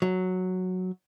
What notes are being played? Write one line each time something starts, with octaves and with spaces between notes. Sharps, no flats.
F#3